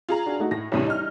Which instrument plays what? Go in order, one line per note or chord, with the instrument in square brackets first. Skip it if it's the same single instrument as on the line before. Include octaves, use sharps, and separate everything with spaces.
[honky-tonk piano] F4 G#4 A#5
[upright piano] D4 F#4
A3 D#4 F#4
[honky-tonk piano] A2 [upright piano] A#6
[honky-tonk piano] E2 A2 C3 [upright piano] G3 D4 C#5
[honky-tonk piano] D#4 F6